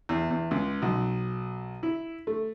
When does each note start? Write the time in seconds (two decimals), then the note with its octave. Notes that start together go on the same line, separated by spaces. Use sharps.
0.09 E2
0.30 E2
0.51 C#2
0.82 B1
1.83 E4
2.27 A3